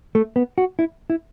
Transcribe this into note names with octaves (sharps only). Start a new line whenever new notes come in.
A3
B3
F#4
E4
E4